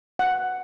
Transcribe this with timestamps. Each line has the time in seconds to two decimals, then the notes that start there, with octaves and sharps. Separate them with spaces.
0.19 F#5